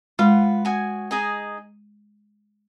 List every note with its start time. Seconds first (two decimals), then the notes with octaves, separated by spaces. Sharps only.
0.19 G#3 F4 B4 F#5
0.65 F#4 C#5 G#5 D#6
1.11 D#4 G#4 D#5 G#5